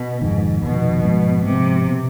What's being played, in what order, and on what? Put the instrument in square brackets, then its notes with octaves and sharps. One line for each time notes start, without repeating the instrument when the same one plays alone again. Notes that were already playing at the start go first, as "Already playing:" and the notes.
Already playing: [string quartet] B2
[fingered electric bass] F1 F2 D#3 [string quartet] G#2
[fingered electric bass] F1 F2 D#3 [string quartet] B2
[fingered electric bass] G#2 F3 G#3 B3
[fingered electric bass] G#2 F3 G#3 B3 [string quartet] C3
[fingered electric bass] B2 B3